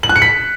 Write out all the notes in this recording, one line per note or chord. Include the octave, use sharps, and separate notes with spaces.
F#7
F#6
C#7
B6